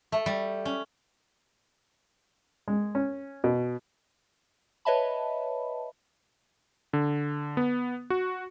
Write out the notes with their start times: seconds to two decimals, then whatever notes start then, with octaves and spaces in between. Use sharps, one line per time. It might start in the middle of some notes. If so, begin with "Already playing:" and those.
0.12 A3
0.26 G3
0.65 C#4
2.68 G#3
2.95 C#4
3.44 B2
4.85 B4 C#5 D#5 E5 A5 B5
6.93 D3
7.57 B3
8.10 F#4